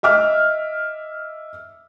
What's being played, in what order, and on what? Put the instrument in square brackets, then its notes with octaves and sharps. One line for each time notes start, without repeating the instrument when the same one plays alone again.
[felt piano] D#5 E5 D6 F6